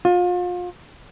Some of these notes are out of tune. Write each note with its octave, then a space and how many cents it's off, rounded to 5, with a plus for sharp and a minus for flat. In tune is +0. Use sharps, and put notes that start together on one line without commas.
F4 +35